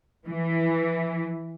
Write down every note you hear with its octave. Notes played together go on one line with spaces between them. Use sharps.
E3